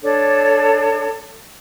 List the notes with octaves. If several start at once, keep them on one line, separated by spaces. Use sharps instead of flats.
D4 A4 C#5